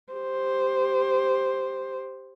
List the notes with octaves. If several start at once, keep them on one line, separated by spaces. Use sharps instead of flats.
G4 C5